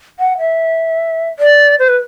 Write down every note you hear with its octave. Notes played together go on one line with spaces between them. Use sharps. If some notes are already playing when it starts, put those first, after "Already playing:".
F#5
E5
D5
C5
B4